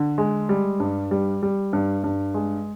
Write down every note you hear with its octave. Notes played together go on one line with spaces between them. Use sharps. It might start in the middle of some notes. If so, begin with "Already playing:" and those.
Already playing: D3
G#3
G3
G2
G3
G3
G2
G2
G#3